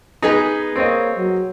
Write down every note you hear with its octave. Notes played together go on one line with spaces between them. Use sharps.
B3 D#4 G#4 B4
A#3 C4 C#5 D#5
F#3